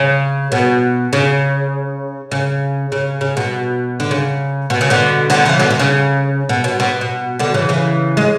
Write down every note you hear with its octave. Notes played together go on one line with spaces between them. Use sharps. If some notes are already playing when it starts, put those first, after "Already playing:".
Already playing: C#3
B2
C#3
C#3
C#3
C#3
B2
D3
C#3
B2
C#3
B2 D3
B2 D3
C#3 E3
B2 D3
B2
C#3
B2
B2
B2
B2
B2 D3
C#3 E3
C#3 E3
G#3